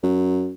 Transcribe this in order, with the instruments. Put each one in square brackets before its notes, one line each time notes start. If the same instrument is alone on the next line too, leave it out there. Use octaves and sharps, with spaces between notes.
[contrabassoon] F#2